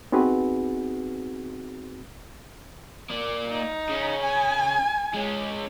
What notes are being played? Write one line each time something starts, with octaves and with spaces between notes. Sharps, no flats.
B3 C4 D#4 F#4 G#4 B4
A#3 D5
D#4
C#3 C#4
G#5
G#3 C#4